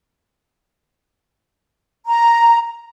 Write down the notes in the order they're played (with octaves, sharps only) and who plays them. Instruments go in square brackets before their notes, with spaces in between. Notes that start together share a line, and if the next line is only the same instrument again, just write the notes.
[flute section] A#5